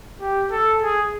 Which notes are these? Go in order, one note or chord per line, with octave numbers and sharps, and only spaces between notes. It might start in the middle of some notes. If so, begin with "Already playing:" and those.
G4
A4
G#4